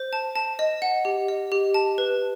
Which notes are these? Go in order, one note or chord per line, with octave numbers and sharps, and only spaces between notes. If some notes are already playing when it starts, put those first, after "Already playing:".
Already playing: C5
A5
A5
D#5
F#5
G4
D#5
G4
A5
B4